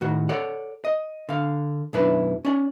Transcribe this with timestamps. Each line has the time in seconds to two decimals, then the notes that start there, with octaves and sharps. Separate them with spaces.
0.01 A2 D#3 F#4
0.29 A4 C#5 D5 F#5
0.85 D#5
1.29 D3 F5
1.93 B1 F#2 D4 E4 B4
2.45 C#4 D5